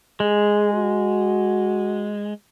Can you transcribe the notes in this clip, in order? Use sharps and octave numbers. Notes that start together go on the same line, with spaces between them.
G#3 G#4
F#4